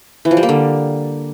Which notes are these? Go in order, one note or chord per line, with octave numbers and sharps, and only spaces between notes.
E3
F3
G3
A#3
D3